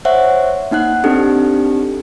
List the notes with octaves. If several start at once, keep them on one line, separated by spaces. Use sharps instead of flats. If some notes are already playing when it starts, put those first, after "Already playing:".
C5 C#5 E5 F#5
A#3 D#4 F#5 F#6
C4 D4 D#4 G4 A4